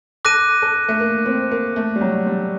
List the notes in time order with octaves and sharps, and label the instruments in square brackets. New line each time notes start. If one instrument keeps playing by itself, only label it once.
[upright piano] A4 [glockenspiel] D6 F#6 A#6 D#7
[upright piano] A4
A3
A#3
C4
A#3
A3
G3
F#3
G3